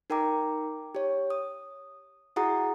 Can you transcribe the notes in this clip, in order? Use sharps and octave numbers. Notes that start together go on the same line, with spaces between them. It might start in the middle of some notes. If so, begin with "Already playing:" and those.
D#4 A#4 G5 A#5 D6
G4 C#5
D#6
E4 F#4 G#4 F#5 A#5 D#6